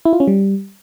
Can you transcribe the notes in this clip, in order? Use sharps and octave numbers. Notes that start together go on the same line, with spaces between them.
E4
F4
C#4
G3